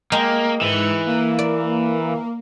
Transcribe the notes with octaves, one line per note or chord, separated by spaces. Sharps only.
G#3 A#3 G4 A#4
G#2 E3 C#7
A#3
D5